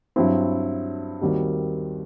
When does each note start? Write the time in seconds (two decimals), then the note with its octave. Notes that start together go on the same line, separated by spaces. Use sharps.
0.16 G2 F#3 C4 E4
1.21 D#2 D#3 G3 C4 F#4